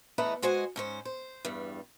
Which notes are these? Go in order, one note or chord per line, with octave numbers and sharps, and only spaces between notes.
E2 A3 E4 B4 D#5 A#5
G#3 F#4 C5 D#5 G#5
G#2 C#4 C5
C5
E2 G2 G3